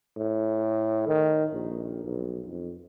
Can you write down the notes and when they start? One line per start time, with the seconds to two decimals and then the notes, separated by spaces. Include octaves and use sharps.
0.17 A2
1.07 D#3
1.53 A#1
2.04 B1
2.46 F2